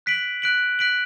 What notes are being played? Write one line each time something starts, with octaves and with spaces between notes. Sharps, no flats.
F#6 B6 D7 F#7
F#6 B6 D7 F#7
F#6 B6 D7 F#7